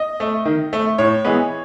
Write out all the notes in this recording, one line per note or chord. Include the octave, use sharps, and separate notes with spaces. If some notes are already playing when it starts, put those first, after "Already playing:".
Already playing: D#5
A3
D#3
A3
A2 C#5
E3 G#3 B3